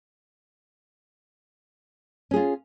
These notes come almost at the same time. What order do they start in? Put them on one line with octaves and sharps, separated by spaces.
C#4 G#4 F4